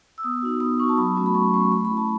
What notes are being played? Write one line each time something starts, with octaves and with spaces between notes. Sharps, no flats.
E6
B3 D#6
D#4 F#4
B3 D#6
D#4 F#4 C#6
A5
F#3 B5
A3 C#4 F#4
B5
F#3 C#6
A3 C#4 F#4 C#6
A3 B5
B5
E4
A5